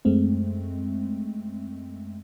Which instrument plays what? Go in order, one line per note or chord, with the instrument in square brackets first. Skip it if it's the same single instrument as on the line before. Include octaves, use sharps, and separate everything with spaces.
[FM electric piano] F#2 G#3 A3 C4